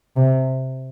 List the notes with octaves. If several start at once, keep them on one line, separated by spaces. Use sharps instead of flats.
C3